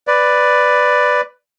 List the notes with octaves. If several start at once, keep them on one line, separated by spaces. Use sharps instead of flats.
B4 D5